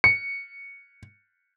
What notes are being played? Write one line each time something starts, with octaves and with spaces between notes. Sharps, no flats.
C#7